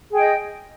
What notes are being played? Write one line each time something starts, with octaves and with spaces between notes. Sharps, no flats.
G#4 D#5 G5